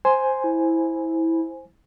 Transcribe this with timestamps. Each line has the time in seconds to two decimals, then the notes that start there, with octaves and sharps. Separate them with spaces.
0.05 C5 G#5 C6
0.44 E4